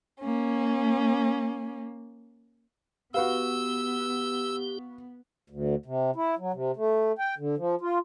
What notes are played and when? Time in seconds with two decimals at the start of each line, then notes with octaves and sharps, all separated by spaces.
0.20 A#3 C#4
3.14 B3 F#4 G4 B4 F5 E6
5.50 D2
5.86 C3
6.16 E4
6.38 F#3
6.54 C3
6.77 A3
7.19 G5
7.38 D3
7.58 F3
7.81 F4